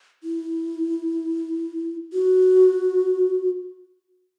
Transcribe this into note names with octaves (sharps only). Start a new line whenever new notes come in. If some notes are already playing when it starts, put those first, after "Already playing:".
E4
F#4